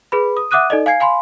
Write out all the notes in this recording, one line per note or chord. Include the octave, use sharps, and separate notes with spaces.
G#4 B4 B5
D#6
E5 F#5 D6 D#6 F#6 D#7
D#4 A4 D5 D#5
F5 G#5 G#6 C7
F5 G#5 B5 C6